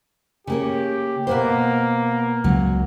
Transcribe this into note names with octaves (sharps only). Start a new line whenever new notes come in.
C#3 A#3 G4 C#5
B2 A#3 B3 C5
C#2 F#3